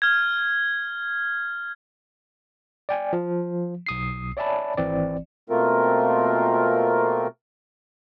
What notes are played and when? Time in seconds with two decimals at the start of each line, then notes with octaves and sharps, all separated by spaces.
0.02 F6 G#6
2.89 D5 G5 G#5
3.13 F3
3.87 B1 D#6 C7
4.37 C#5 D5 E5 G#5 A5 B5
4.78 G#1 E3 C4 D5
5.50 B2 A3 A#3 C4 F4 A#4